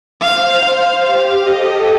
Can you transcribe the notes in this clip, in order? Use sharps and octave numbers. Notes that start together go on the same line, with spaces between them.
C5 F5
F5
G4 F5
A4 D#5